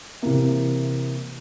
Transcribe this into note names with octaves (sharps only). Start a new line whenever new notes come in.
C3 E3 A#3